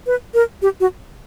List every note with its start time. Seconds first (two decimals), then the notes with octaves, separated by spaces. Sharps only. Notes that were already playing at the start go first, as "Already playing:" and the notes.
0.06 B4
0.34 A#4
0.62 G4
0.80 F#4